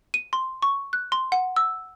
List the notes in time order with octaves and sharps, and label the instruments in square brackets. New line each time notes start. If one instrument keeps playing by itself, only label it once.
[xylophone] D#7
C6
C#6
F#6
C6
F#5
E6